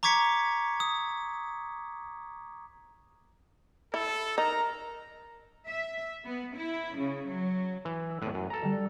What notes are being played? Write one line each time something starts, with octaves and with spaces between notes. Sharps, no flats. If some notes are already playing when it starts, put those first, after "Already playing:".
A#5 C#6 D6 G#6 B6 C#7
D#6
E4 A4
D#4 A#4 A#5
E5
B3
E4
C#3
F#3
E3
E6
E2 A2 F#6 D#7
F#2
A4 A#5
D3 G3